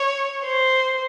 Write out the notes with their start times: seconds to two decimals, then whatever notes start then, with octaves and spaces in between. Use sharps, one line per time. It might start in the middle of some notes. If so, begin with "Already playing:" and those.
Already playing: C#5
0.45 C5